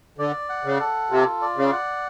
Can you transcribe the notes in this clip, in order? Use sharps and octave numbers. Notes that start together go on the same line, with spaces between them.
D3 D5
F#5
C#3
A4
C3 F4
D5
C#3
F#5